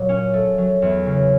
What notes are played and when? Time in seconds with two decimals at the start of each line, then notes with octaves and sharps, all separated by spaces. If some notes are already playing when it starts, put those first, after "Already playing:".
Already playing: A#2 F#3
0.09 C#4
0.34 A3
0.58 F#3
0.82 E2
1.06 C#3